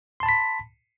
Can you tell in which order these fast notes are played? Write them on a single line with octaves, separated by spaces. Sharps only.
C6 A5 B5 B6